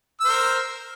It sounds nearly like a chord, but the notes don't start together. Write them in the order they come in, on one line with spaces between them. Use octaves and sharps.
E6 C5 A#4